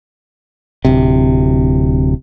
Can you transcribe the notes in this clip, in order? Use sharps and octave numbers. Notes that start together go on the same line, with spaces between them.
D1 C3